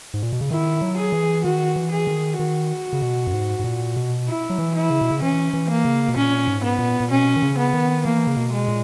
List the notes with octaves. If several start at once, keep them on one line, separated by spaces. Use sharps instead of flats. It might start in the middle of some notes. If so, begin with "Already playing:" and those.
G#2
A#2
B2
C#3
D#3 E4
F#3
G#4
E3
D#3 F#4
E3
G#4
D#3
D#3 F#4
C#3
B2
F#2
G#2
G#2
A#2
B2
E4
F#3
E3
E4
C#3
B2
C#3
E3 C#4
E3
A#3
C#3
B2
A#2 C#4
G#2
B3
A#2
A#2
B2 C#4
D#3
C#3
B3
D#3
E3 A#3
C#3
B2
G#3
A#2